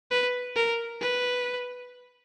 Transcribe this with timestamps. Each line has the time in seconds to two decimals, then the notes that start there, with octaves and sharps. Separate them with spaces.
0.11 B4
0.56 A#4
1.01 B4